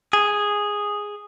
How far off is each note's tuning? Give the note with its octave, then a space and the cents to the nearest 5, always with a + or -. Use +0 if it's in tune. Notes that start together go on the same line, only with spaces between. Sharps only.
G#4 -5